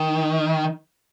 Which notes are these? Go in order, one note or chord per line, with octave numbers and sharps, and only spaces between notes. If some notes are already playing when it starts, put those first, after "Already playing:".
Already playing: D#3